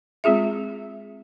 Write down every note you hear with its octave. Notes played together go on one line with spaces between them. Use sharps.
G#3 C4 F4 G#4 E5